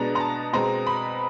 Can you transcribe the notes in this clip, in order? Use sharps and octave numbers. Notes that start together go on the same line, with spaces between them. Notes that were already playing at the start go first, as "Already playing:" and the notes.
Already playing: B2 G#3 B3 D4 A#5
A#5
A5
B2 G#3 C4 A#5
B5